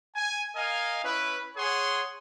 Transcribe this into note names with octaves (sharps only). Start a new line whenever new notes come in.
G#5
A#4 D#5 F5 G#5
C#4 E4 B4
G#4 C#5 F#5 G#5 C6